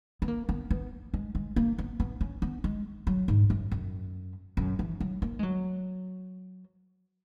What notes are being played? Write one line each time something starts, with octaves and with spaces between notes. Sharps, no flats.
B3
A#3
B3
B3
G#3
G#3
A#3
B3
B3
C#4
B3
G#3
F#3
G#2
F#2
F#2
F#2
E3
F#3
A#3
G#3
F#3